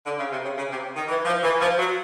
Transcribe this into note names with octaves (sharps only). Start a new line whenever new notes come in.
D3
C#3
C3
C#3
C#3
C3
D#3
E3
F3
E3
F3
F#3